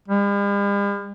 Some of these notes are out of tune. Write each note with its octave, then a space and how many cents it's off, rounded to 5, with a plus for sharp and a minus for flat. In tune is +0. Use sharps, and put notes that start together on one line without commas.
G3 +45